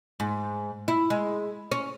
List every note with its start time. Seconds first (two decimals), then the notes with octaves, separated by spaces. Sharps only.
0.20 G#2
0.88 E4
1.10 G#3
1.72 C#4